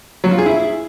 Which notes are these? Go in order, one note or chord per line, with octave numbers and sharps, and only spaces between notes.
F#3
F4
G#4
E4